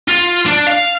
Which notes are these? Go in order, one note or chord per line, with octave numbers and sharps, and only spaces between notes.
F4
D4
F5